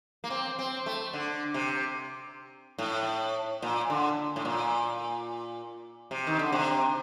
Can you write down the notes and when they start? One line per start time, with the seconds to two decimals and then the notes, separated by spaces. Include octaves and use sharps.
0.24 A#3
0.30 C4
0.59 C4
0.86 A3
1.13 D3
1.54 C3
2.78 A2
3.62 A#2
3.90 D3
4.36 A2
4.45 A#2
6.11 C3
6.27 D#3
6.39 D3
6.52 C3